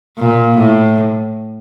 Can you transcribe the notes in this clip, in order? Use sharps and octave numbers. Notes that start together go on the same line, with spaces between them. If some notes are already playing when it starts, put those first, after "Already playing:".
A#2
A2